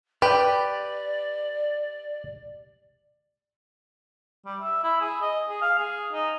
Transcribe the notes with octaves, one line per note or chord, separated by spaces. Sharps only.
G4 B4 D5
G3
E5
E4
G#4
D#5
G#4
F5
G#4
D#4